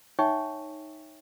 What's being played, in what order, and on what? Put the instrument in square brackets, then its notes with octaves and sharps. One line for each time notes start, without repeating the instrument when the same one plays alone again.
[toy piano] D#4 C#5 E5 G5 G#5 C#6